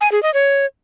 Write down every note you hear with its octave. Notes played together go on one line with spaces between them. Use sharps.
G#5
G#4
D#5
C#5